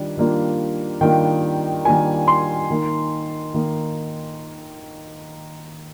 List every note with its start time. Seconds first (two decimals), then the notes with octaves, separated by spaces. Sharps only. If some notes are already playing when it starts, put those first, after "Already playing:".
Already playing: D#3 G3 D4 F4
0.17 D#3 G3 A#3 D4 F4
1.01 D#3 G3 A#3 D4 F4 G5
1.85 D#3 G3 A#3 D4 F4 G#5
2.28 C6
2.70 D#3 A#3 D#4
3.54 D#3 A#3 D#4